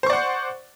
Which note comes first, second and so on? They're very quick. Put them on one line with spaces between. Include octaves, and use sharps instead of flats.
C5 C#6 D5 F#5